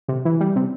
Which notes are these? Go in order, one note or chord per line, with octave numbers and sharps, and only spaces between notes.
C3
E3
G3
C3